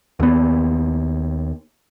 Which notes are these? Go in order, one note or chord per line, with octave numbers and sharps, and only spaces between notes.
D#2 B3